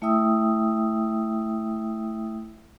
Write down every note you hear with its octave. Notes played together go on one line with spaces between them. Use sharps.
A3 E4 E5 G5 D#6 E6